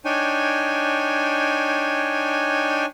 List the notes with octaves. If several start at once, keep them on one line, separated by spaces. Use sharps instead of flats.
D4 D#4 C#5 G5 G#5